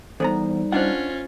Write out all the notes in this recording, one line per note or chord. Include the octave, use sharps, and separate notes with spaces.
E2 G3 B3 D#4 A4 C5 A#5
C#4 D4 F4 C5 D#5 F#5